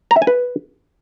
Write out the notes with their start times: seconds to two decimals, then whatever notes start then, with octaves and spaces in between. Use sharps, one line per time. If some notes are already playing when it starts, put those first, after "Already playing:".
0.11 A#5
0.16 E5
0.22 G#5
0.27 B4